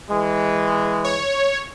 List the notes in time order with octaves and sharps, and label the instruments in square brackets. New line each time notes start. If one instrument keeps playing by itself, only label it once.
[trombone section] E3 G#3
[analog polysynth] C#5